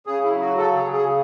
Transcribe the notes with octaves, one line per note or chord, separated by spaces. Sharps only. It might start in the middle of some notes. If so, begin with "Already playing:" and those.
C#3 G#4
E4
F#3
F#4
C#3 A4
G#4
C#3
G#4